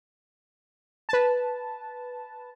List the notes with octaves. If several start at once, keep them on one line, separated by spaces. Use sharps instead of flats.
B4 A5